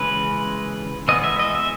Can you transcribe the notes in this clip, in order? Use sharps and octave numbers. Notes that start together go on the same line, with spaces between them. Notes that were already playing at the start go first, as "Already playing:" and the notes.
Already playing: C#3 E3 G#3 C#4 B4
E3 G#3 B3 D#5
E5
D#5
E5